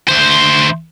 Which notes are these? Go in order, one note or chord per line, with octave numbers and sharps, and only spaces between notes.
D2 C5